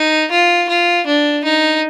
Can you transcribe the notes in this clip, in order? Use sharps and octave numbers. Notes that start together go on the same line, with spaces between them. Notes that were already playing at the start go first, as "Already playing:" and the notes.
Already playing: D#4
F4
F4
D4
D#4